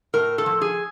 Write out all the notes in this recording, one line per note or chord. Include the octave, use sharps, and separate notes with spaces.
A2 A#4
A4
F3
G#4